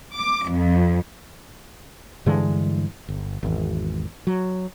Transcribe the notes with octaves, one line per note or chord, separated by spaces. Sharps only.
D6
F2
G2 D3 E3 G#3
G1
G#1 E2
F#3